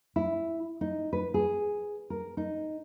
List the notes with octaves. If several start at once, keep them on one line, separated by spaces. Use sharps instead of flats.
E4
D#4
B4
G#4
A#4
D#4